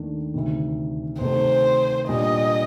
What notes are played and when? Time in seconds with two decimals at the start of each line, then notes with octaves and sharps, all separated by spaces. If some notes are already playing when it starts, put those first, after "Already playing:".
Already playing: D#2 D#3 A3 D4
0.34 D2 C3 D#3
1.21 C3 D#3 A3 C5
2.09 A#2 G3 D4 G4 D#5